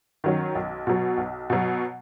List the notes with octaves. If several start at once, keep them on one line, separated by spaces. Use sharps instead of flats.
D#3 F#3 C#4
B1
B2 F#3
B1
B2 F#3